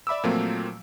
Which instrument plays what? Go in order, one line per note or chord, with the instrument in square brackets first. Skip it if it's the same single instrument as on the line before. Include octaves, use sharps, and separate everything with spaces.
[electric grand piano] D5 E5 B5 D6 E6
A#2 F3 F#3 A3 A#3 C4